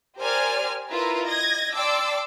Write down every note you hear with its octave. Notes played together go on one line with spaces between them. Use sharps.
G4 A#4 C5 D5 G#5 F6
E4 F4 A#4 B4 E5 A#5
D#5 G#6 A#6
D5 G5 A5 C6 D6 E6